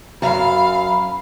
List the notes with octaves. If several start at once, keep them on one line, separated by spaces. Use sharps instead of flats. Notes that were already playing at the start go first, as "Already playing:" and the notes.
F#2 F5 B5